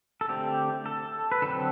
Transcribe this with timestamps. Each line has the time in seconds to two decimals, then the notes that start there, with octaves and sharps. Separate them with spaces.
0.21 A4
0.29 D3 A3 C4 G4
0.86 A4
1.32 B4
1.42 D3 F#3 C4 A4